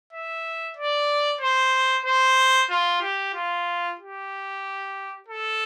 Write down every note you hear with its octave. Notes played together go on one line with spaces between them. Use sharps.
E5
D5
C5
C5
F4
G4
F4
G4
A4